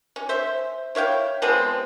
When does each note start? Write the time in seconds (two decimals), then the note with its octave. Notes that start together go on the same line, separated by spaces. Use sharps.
0.16 C#4
0.29 C5 E5
0.95 E4 C#5 F5 G5
1.42 F3 G#3 B3 C4